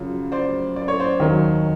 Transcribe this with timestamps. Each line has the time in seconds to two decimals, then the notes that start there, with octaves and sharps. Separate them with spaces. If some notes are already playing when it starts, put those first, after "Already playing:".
Already playing: F#2 C#3 F3
0.32 C5 D5
0.76 D5
0.88 C#5
1.00 C5 D5
1.20 D#2 D#3 F#3